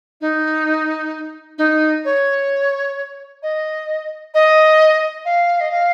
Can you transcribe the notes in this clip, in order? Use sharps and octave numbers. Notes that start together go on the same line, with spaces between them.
D#4
D#4
C#5
D#5
D#5
F5
D#5
F5